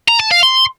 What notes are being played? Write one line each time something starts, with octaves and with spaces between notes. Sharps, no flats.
A#5
A5
F5
C6